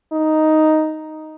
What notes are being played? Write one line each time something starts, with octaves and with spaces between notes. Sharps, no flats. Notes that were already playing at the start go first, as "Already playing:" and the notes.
D#4